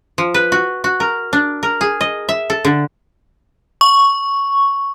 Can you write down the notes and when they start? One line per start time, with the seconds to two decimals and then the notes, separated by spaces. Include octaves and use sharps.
0.18 F3
0.34 B4
0.52 F#4
0.84 F#4
1.00 A#4
1.33 D4
1.63 A#4
1.81 G#4
2.01 D#5
2.29 E5
2.50 A4
2.65 D3
3.81 C#6